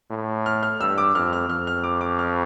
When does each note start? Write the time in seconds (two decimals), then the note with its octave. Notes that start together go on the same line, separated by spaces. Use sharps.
0.10 A2
0.46 F6
0.63 F6
0.81 G2 E6
0.98 D6
1.15 F2 F6
1.33 F6
1.49 F2 F6
1.67 F6
1.84 D6
2.01 D6
2.19 F6